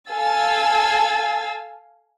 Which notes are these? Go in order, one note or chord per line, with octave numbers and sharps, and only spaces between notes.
A4 F5 G#5 E6 A6